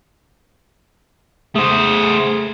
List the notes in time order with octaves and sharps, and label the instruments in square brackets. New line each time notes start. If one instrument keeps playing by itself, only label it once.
[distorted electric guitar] A3 C5 [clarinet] G#4